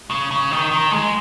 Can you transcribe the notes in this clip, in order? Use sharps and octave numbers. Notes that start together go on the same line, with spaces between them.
C#3
C#3
D#3
D#3
G#3